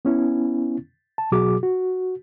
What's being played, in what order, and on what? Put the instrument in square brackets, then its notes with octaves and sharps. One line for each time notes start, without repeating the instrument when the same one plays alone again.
[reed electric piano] B3 C#4 E4
A5
B2 F#3 F#4 G#4 D6
F#4